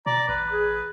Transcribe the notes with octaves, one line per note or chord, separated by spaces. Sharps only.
B2 D5 A#5
A1 B4
G#4